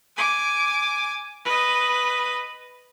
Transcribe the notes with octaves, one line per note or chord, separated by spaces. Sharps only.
G#5 D6
B4 D#5